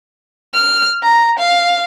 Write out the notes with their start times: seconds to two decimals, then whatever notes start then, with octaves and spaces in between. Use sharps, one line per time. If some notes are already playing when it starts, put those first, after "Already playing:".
0.54 F6
1.03 A#5
1.39 F5